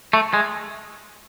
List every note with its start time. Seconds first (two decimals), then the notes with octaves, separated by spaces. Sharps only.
0.13 A3
0.34 G#3